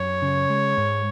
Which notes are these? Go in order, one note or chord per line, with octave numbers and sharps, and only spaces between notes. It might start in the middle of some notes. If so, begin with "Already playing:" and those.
Already playing: F#2 C#5
C#3
G#3
G#2